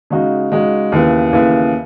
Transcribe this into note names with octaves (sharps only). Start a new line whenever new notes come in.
C#3 G#3 D#4 F#4
C#3 G#3 D#4 F#4
D#2 C#3 E3 B3 E4
D#2 C#3 E3 B3 E4